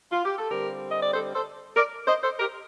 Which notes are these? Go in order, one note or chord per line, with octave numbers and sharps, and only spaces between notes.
F4
G4
A4
D3 G3 C4 G4 A#4
D#5
D5
A4 C5
A4 C5
A#4 D5
C5 D#5
A4 C5
G4 A#4